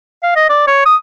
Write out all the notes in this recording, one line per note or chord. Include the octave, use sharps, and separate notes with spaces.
F5
D#5
D5
C#5
D#6